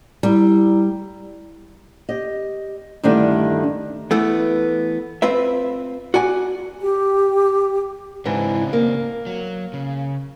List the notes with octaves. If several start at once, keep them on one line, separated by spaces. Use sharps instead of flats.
G3 E4 A#5
G4 D#5
G2 D3 D#3 A3 D4 E4
E3 A3 B3
C4 F4 B4 E5
F#4 D5 G#5
G4
G#2 C#3 E3 C4 D4
A#3
F#3
C#3